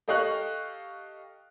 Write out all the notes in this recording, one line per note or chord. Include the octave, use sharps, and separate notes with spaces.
G4 A4 D#5 F5 C#6 F#6